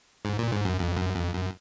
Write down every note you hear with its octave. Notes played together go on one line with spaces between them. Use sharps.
G#2
A#2
G#2
F#2
F2
F#2
F2
F#2